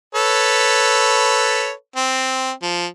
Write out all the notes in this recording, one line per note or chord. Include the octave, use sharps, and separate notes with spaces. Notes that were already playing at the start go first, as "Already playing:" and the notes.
A4 B4 C#5
C4
F3